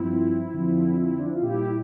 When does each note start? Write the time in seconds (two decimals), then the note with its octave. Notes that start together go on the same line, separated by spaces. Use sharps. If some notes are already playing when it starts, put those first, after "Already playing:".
Already playing: G2 F3 C4 E4
0.53 F2 D3 F3
1.19 D4
1.27 E4
1.35 F4
1.41 A#2 G3 E4 G4